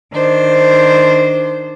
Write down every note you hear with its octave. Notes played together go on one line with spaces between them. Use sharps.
D#3 D4 C5